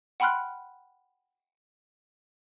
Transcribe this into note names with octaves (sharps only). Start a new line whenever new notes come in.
F#5 G5 B5 C6 F6 F#6